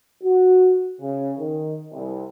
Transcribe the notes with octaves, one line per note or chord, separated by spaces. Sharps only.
F#4
C#3
D#3
C2